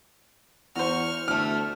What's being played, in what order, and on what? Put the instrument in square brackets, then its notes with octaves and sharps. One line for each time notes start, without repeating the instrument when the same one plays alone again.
[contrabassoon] E2 [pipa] F#4 C5 [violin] C#6 F6
[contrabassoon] D2 [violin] A3 [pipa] G4 A4 [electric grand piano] F6